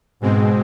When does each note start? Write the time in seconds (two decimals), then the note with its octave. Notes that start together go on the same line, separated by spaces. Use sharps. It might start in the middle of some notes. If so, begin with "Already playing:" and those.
0.21 G#2 B2 G#3 C4